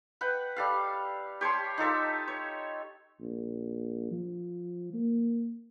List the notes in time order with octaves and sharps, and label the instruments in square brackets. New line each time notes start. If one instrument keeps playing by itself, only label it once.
[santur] B4 F#5 G5
G3 A4 F5
G4 C#5 A5 C6
D#4 F4 A4 E5
C#5
[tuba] A#1
F3
A#3